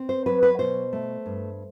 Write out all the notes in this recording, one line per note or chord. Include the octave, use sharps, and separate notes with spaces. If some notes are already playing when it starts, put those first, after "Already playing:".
Already playing: C4
C5
F#3 B4
B4
B2 C5
A3
G2